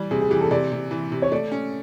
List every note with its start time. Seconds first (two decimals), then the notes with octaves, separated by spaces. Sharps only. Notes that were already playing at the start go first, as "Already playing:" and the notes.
Already playing: E3 G3
0.11 C3 G#4
0.21 G#4
0.30 E3 G4
0.41 A4
0.51 C3 D5
0.72 C3
0.91 E3
1.12 C3
1.22 C#5
1.32 A3 D5
1.52 C#4